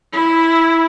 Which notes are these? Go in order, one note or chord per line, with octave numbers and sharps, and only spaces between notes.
E4